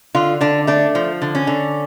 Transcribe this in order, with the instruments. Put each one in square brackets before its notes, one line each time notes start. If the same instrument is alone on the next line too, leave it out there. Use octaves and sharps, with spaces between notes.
[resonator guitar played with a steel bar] D3 F4
D3 D4
A3 D4
F3
D3
C#4
D3